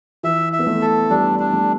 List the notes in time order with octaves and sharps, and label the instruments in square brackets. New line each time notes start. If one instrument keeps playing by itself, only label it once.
[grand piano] E3 [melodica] E5
[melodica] E5
[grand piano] B3
A3
[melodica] A4
[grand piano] G3 [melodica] D4
[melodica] D4
[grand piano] A3